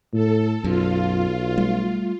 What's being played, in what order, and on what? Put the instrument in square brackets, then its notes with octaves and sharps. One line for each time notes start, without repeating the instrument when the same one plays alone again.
[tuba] A2 [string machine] A4
[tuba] B1 [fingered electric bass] F#2 [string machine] F4
[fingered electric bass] G3 A3